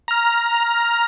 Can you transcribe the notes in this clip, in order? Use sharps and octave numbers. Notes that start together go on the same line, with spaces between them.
A#5 F6